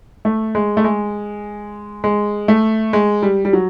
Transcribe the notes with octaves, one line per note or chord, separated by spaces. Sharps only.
A3
G#3
A3
G#3
G#3
A3
G#3
G3
G3
F#3